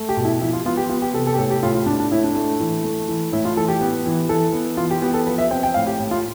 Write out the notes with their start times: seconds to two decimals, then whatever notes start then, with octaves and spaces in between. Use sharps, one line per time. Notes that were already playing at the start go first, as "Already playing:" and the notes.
Already playing: A3
0.09 G4
0.17 B2
0.25 E4
0.41 F3 E4
0.53 F4
0.65 B3 F4
0.77 G4
0.89 B3 F4
1.02 G4
1.14 C3 A4
1.27 A4
1.34 G4
1.38 A2 A4
1.51 G4
1.63 A2 F4
1.75 F4
1.86 A2 D4
2.00 D4
2.11 A2 E4
2.24 D4
2.35 A3
2.60 E3
2.84 A3
3.08 E3
3.32 A2 E4
3.45 F4
3.56 E3 A4
3.68 G4
3.81 B3
4.06 E3
4.29 E3 A4
4.53 B3
4.77 E3 F4
4.91 G4
5.02 B3 G4
5.14 A4
5.26 F3 B4
5.38 E5
5.51 C4 G5
5.63 G5
5.74 A2 F5
5.87 G4
5.99 A2
6.11 F4